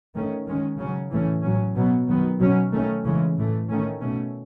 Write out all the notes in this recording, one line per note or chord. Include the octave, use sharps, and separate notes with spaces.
D#3 A3 C#4
D#3 G#3 C#4
C#3 F#3 C#4
A2 E3 A3 C#4
A2 F#3 C#4
B2 F#3 B3
D#3 F#3 B3
B2 F#3 C#4
D#3 A3 C#4
C#3 E3 G#3 C#4
A2 E3 A3
D#3 A3 C#4
B2 A3 C#4